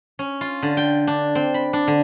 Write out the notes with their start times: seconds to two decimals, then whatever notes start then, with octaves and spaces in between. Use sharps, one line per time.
0.19 C#4
0.41 F4
0.63 D3
0.77 G5
1.07 D4
1.35 C4
1.54 B5
1.73 D4
1.88 D3